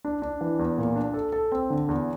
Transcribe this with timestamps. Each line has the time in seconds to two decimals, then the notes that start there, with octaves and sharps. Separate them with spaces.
0.05 D4
0.22 D4
0.41 E3
0.59 E2
0.78 A#2
0.96 D4
1.14 A4
1.32 A4
1.52 C4
1.70 D3
1.89 E2